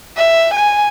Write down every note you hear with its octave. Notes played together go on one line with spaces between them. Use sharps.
E5
G#5